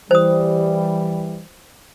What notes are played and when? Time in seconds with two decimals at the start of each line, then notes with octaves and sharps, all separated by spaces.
0.11 E3 G3 C5 D#6